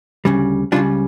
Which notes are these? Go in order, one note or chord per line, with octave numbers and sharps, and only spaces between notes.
D2 C#3 G3
C#2 C#3 G3 D4 F4